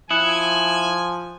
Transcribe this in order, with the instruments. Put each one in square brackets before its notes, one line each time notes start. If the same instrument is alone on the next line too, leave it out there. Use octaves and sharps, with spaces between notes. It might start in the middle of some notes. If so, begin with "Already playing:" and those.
[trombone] F3 [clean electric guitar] E4 [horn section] G#5 [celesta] D#6 F#6 C#7